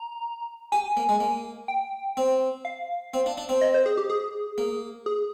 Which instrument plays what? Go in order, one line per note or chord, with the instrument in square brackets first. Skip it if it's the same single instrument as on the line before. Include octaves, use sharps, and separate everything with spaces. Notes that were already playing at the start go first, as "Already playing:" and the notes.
Already playing: [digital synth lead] A#5
[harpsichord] G4 [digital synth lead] G#5
[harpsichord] A#3
G#3
A#3
[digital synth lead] G5
[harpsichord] C4
[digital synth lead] F5
[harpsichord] C4
D4
D4
C4
[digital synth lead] D#5
C5
G#4
G4
G#4
[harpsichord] A#3
[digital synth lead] G#4